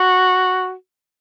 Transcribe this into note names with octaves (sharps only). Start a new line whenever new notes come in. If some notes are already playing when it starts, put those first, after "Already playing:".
Already playing: F#4